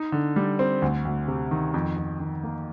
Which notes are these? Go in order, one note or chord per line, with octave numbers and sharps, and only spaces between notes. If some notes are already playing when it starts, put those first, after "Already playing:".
Already playing: D#4
D3
G3
C4
D2
D2
C3
D#3
F2
F2
D#3
A#3